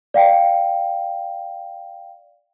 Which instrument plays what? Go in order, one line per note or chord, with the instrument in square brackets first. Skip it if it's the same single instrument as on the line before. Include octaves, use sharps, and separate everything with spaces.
[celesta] D5 F5 G5